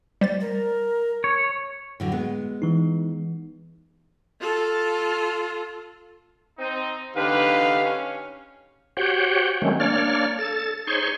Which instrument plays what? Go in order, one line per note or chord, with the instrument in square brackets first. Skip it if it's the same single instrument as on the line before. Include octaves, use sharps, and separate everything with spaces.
[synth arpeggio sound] G3 C5 A6
[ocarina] A#4
[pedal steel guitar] C#5
[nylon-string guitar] A2 D3 F#3
G#3 B3
[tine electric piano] E3 D#4
[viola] F4 A4
[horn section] C4 D#4
[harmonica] D3 D#4 G4 [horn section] B4 [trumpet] F5
[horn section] C#4
[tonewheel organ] F#4 G4 C5 C#5 F#5 G5
D#3 F#3 G#3 A3 C4 C#4
A#3 D4 C#5 D5 F6
A4 A6
D#4 G#4 C5 C#5 C6 C#6